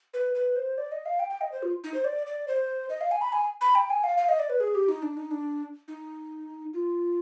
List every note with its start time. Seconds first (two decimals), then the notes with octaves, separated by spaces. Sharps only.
0.14 B4
0.35 B4
0.56 C5
0.78 D5
0.92 D#5
1.06 F5
1.19 G5
1.30 G5
1.41 D#5
1.52 C5
1.63 F4
1.84 D#4
1.94 C5
2.04 D5
2.27 D5
2.48 C5
2.90 D#5
3.01 F5
3.11 G#5
3.21 B5
3.32 G#5
3.61 B5
3.75 G5
3.90 G#5
4.04 F5
4.17 F5
4.29 D#5
4.39 D5
4.50 B4
4.60 G#4
4.75 G4
4.88 D#4
5.02 D4
5.17 D#4
5.31 D4
5.88 D#4
6.74 F4